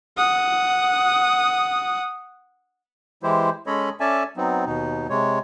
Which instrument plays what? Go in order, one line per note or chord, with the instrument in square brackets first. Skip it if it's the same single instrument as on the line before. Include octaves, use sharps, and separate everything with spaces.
[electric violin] F#5 D#6
[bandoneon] E3 G#3 E4 G4 C5
G#3 C#4 A4 C#5 D#5 B5
C#4 A4 D5 E5 G#5 A5
F#3 B3 C4 D#4
D#2 B2 D#4
C3 G#3 C#5